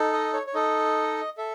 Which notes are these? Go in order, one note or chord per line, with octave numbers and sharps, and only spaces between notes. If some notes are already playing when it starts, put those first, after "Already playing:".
Already playing: D#4 A4
D#5
C#5
C#5
D#4 A4 D#5
A4 E5